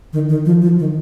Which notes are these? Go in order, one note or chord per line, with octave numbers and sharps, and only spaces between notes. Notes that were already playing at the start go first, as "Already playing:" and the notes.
D#3
D#3
F3
F3
D#3